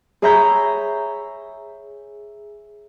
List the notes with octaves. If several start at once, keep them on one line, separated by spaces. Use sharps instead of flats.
G#4 C#5 E5 A#5 B5 G6